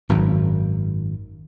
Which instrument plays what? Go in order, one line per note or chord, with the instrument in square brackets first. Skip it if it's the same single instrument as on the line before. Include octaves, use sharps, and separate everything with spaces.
[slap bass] G#1 F#2